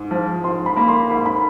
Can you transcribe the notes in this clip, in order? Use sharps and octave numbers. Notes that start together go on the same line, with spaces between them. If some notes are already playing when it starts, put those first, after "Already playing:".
Already playing: G#2
F3
G#2 C6
B5
A#3 B5
C6
G#2 B5
B5